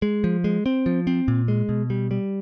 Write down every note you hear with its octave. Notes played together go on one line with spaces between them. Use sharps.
G#3
F3
G#3
C4
F3
C4
A#2
G#3
B2
G3
G3